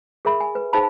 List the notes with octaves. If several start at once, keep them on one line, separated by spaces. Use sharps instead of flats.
G#4 A#4 E5 B5
G#5
B4
D#4 G#4 C5 F5 A5 B5